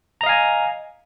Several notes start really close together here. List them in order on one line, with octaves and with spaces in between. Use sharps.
A#5 D#5 F5 G#5